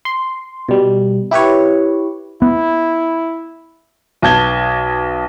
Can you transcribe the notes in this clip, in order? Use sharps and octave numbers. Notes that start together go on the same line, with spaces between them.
C6
B2 G3
E4 G4 B4 C#5
B3 E4
B1 B3 A5 G#6 G7